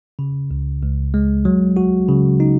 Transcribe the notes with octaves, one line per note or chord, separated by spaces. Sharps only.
C#3
C#2
C#2
G#3
F#3
F#4
C#3
D#4